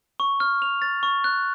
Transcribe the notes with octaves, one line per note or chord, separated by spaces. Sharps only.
C#6
F6
F7
A6
C#6
F#6